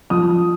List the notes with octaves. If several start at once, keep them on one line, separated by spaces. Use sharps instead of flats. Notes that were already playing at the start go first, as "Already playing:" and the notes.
F3 D#6